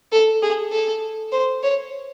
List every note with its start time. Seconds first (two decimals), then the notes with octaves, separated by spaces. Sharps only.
0.12 A4
0.42 G#4
0.72 A4
1.32 C5
1.63 C#5